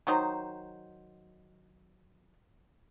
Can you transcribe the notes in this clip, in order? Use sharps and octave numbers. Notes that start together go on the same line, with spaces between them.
D#3 F#3 D#4 C5